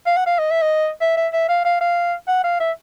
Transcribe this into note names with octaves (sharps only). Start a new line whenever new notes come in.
F5
F#5
F5
D#5
E5
D#5
E5
E5
E5
F5
F5
F5
F#5
F5
E5